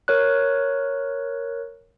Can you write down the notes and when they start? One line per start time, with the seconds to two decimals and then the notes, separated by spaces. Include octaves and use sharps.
0.08 A#4 C#5 F#6